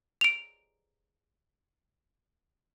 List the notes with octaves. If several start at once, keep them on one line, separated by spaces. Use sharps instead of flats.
D7 F7